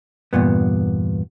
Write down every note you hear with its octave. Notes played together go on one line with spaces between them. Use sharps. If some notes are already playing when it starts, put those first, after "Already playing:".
E2 G2 A#2 B3